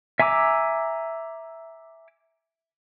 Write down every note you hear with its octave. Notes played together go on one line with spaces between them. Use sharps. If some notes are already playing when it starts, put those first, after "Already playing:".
E5 G#5 A#5 D6 E6